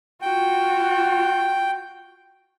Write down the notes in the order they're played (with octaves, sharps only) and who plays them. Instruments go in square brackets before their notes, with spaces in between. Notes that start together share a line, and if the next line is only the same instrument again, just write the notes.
[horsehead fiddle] F4 F#4 [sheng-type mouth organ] G5